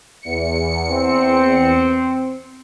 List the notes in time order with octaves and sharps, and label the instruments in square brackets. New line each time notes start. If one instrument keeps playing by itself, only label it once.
[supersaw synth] E2 C#7
[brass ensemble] C4